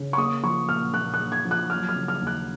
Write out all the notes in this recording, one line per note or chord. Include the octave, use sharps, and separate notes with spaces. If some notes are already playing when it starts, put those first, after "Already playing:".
Already playing: C#3
C#6
A#3 D#6
F3 C#6
A#2 F6
A#2 F#6
F#6
A#3
G#6
F3
F#6
F#3 F6
F6
C#3
F6
D#2
F#6